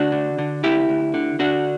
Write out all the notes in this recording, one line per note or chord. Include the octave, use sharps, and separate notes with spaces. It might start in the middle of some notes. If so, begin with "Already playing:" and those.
Already playing: D2 D4 F#4
D3
D3
D2 E4 G4
D2
D3
D3 D4 F#4